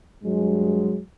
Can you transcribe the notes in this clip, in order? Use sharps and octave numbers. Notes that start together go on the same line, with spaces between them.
G2 F#3 G#3